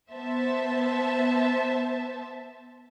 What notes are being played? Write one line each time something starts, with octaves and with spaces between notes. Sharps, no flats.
B3 C5 E5 A5